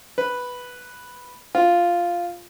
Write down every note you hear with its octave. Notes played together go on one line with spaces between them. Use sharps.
B4
F4